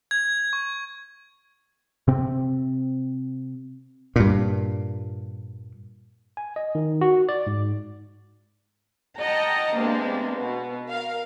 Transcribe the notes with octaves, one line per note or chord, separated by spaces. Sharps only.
G#6
C#6
C3 C4
G2 A#2
G#5
D#5
D#3
F#4
D5
G#2
D#5 F#5 G5 A5 A#5
C3 G#3 A#3 B3 D4
B2
A#4 F5